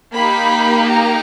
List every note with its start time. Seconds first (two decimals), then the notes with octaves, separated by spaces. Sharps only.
0.13 A#3 D#4 G4 B5
0.90 A#5